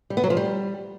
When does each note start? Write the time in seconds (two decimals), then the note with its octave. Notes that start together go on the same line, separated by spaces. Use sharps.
0.10 G3
0.17 B3
0.24 F#3
0.30 F3
0.37 G3